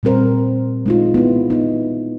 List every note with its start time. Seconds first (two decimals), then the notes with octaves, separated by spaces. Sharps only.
0.03 A#2 G3 C4 A#4 C5
0.86 G#3 D#4 F4
1.14 B3 E4
1.50 B3 D#4